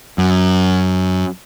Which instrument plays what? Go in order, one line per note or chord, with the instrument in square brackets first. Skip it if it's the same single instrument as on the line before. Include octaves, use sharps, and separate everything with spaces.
[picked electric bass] F#2